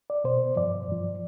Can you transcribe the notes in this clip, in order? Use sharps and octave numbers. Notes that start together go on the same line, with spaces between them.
D5
B2 C5
G2 F3 D5
G2 F3